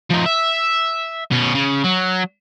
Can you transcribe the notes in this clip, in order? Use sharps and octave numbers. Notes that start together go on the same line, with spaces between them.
F3 D#4
E5
B2 C#4
C#3
F#3